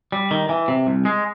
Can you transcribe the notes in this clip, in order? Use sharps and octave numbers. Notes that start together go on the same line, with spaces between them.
G3
D#3
E3
C3
C2
G#3